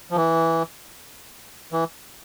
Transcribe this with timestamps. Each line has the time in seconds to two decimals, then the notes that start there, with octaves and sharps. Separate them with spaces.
0.11 F3
0.16 E3
1.73 E3